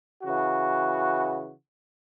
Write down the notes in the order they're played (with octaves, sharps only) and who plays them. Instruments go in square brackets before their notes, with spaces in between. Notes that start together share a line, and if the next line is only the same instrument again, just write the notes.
[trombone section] C#3 E3 F#4